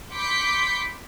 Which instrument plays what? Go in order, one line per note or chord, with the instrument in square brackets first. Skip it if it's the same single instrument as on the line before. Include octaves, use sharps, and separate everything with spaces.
[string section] B5 C6 D6 G6 B6 C#7